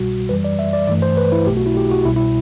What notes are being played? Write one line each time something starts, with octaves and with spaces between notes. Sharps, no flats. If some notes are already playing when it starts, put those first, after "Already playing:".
Already playing: C2 B2 G3 F#4
F#2 E3 G3 B4
D5
E5
D5
G2 E3 A3 D5
C5
B4
E4
B1 B2 A3 G4
F#4
E4
G4
F#4
C2 B2 G3 E4
E4